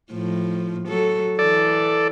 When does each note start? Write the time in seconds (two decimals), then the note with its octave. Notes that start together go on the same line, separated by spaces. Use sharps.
0.12 A2 F3
0.88 F#3 A4
1.39 E3 A4 D5